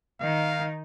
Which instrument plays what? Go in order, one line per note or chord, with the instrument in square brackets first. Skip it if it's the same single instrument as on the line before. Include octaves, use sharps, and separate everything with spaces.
[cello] D#3 D#4 [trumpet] F5